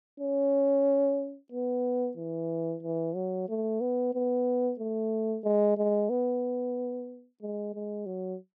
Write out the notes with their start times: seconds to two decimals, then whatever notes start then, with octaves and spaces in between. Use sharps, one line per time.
0.20 C#4
1.52 B3
2.17 E3
2.83 E3
3.15 F#3
3.49 A3
3.81 B3
4.14 B3
4.80 A3
5.44 G#3
5.77 G#3
6.10 B3
7.42 G#3
7.74 G#3
8.06 F#3